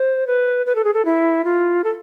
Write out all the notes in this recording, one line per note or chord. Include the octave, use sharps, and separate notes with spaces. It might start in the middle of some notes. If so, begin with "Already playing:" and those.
Already playing: C5
B4
B4
A4
G#4
A4
E4
F4
A4